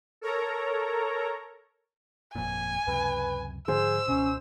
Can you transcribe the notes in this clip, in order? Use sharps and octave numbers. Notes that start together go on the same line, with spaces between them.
A4 A#4 C#5 A#5
G1 F2 A#2 G#5
C#2 F#2 C3 B4
G#2 D3 F3 G#4 C5 E6
C#2 B2 C#4